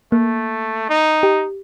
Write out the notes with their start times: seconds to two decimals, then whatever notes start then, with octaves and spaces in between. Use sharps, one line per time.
0.12 A3 A#3
0.90 D#4
1.23 G4